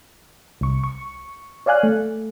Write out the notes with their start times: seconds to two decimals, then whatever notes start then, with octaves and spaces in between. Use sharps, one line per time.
0.61 C2 C#6
0.84 C#6
1.66 C#5 D5 F5 G#5 F#6
1.83 A3